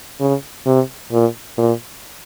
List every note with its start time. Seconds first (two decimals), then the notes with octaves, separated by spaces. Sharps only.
0.21 C#3
0.66 C3
1.12 A#2
1.58 A#2